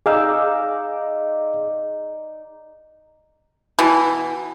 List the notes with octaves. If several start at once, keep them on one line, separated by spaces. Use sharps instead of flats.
D#4 G#4 D5 F5 E6
B2 E3